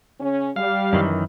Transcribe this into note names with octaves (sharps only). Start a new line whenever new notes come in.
C#3 C#4
G3 F5
F#2 D#3 E3